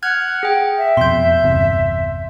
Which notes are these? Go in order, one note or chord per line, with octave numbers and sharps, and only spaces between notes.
F#5 F6 F#6 G#6
G#4 G5
E5
F2 B2 C6 G6
G1 E2 C3